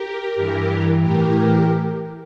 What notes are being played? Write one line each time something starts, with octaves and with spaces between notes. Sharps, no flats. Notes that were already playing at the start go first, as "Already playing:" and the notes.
Already playing: G4 A#4
G2 E3
A2 E3 G4 A#4